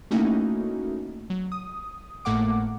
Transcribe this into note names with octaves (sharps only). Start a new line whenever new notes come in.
A3 A#3 C#4 D#4 E4 F#4
F#3
D#6
G#1 A2 A3 A#3 F#5 D6